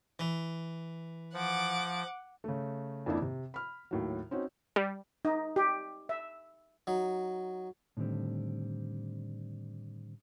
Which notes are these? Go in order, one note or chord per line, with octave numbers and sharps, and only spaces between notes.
E3
F3 F#5 D6
C#3 A3
F2 D#3 A#3 D4 E4
C3
B5 F6
D#2 A2 F#3
C4 C#4 D#4 F#4
G3
D#4
G4
E5
F#3 D#4
A2 D3 D#3 G3 C4